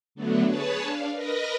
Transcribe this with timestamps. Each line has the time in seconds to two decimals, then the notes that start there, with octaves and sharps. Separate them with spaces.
0.15 D3 F#3 A3 B3 D4
0.46 G#4 B4 C#5 A5
0.83 D4 F5
1.13 A#4 B4 D#5 A#5